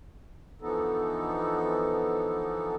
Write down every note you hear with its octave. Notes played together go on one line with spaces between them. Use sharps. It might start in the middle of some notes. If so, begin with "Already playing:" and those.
D3 E3 F3 B3 D#4 A4